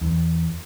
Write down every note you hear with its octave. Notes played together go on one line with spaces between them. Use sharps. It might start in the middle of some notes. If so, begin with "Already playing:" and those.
E2